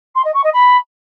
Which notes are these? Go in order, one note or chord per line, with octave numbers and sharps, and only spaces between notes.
C6
D#5
C#6
D#5
B5